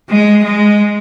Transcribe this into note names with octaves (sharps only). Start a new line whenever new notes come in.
G#3
G#3